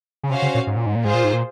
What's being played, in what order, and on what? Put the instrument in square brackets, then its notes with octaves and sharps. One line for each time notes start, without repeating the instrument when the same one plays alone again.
[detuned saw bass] C#3
[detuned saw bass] C3 [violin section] C#4 F#4 C5 F5
[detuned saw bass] C#3
A#2
G#2
A#2
G#2
A#2
[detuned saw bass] G#2 [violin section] F4 G#4 C5
[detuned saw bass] A#2
G#2
A#2